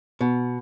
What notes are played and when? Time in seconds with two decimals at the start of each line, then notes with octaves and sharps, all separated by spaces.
0.21 B2